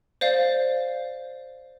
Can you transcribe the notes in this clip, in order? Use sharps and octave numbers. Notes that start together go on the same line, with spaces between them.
C5 D5 F5